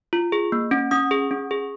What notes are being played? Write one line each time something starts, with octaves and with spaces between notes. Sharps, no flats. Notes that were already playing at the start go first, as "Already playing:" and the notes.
F4
G#4
A#3
C#4
C#4 D#6
G#4
C#4
G#4